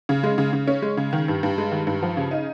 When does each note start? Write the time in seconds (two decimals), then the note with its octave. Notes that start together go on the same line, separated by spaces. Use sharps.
0.09 C#3
0.23 G#3
0.38 C#3
0.53 C#3
0.68 C#4
0.82 G#3
0.97 C#3
1.13 D#3
1.28 G2
1.43 G2
1.58 G#3
1.72 D#3
1.87 G2
2.02 F3
2.17 C#3
2.31 D#4